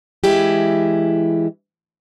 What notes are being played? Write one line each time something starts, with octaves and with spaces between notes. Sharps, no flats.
E3 G#3 E4 G4